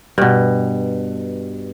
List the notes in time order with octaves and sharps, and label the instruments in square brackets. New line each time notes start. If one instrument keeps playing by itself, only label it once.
[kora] G2 B2